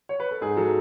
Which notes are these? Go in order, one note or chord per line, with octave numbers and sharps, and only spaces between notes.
C#5
B4
A4
G#2 G#4
F#3 A4